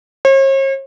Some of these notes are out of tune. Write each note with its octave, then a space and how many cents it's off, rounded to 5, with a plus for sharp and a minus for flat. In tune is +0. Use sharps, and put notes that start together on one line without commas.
C#5 -45